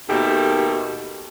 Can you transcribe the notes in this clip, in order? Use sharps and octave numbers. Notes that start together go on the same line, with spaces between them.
D#2 B2 D#3 A3 G4